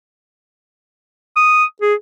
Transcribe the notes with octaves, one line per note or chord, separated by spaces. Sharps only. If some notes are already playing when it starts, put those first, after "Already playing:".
D#6
G#4